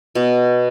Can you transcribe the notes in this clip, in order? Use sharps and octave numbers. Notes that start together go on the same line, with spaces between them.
B2